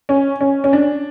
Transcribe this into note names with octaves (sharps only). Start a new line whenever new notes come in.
C#4
C#4
C#4
D4